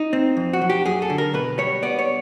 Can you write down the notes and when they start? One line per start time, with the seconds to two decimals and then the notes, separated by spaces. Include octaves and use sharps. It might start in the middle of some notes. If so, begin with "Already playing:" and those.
Already playing: D#4
0.13 C4
0.37 F2
0.53 F#4
0.61 F#3
0.70 G4
0.86 F#2 G#4
1.02 A4
1.10 D3
1.18 A#4
1.34 B2 B4
1.58 G3 C#5
1.82 B3 D5
1.99 C#5